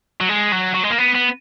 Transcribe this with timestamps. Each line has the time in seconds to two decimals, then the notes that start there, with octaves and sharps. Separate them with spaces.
0.21 F#3
0.29 G#3
0.52 F#3
0.74 F#3
0.84 G#3
0.90 A#3
0.98 B3
1.15 B3